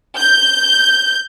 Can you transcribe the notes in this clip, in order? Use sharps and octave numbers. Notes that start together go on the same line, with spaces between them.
G6